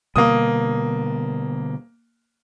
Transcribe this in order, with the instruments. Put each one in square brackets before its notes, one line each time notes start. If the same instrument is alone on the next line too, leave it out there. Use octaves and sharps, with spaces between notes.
[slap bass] B2 D3 G3 [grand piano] A#3 D#6